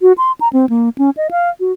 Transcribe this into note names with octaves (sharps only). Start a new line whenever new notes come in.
F#4
C6
A#5
C4
A#3
C#4
D#5
F5
F#4